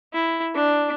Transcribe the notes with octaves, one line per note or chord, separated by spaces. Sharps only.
E4
D4